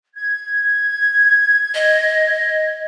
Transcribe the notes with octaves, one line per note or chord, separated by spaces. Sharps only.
G#6
D#5